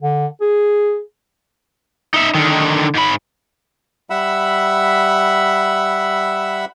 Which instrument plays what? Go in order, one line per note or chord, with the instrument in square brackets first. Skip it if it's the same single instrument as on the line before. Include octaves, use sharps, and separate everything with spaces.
[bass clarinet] D3
G#4
[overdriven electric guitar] D#4 E5
D3 D#3
G#2 B5
[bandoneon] G3 E5 F#5 B5 E6